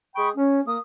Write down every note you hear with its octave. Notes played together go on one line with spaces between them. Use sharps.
G#3 G5 B5 C#6 D#6
C#4
A#3 D#6